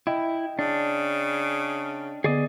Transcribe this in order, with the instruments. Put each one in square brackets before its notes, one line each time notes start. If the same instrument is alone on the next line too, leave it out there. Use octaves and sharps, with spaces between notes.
[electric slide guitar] E4 [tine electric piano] D#5 G5
[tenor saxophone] C#3 [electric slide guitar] D4
[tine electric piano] D3 B3 [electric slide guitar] G#4 D5 D#5